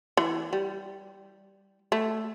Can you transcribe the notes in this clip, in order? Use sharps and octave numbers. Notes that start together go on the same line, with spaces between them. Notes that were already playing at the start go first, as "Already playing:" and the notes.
E3
G3
A3